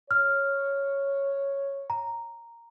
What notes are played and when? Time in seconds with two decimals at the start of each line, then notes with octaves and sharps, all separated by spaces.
0.11 C#5 F6
1.90 A#5